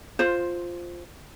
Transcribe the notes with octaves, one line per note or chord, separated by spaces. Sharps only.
F4 C5